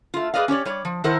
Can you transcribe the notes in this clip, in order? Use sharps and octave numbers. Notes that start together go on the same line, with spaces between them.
A3 F4
G#4 B4 D5 D#5 F5
C#4 G4 C#5 D5
G3 C#5 D5
F3
D#3 E4 A4 A#4 C5 F#5